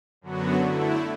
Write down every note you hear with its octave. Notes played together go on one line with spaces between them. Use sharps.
F#2 D3 F#3 B3 F#4
D3 A3 E4